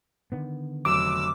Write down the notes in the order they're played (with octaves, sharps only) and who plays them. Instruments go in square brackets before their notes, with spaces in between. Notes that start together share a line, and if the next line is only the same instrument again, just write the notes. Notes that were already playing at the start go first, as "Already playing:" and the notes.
[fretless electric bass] D3 D#3 B3
[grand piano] F1 F#3 [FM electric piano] D6 [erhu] E6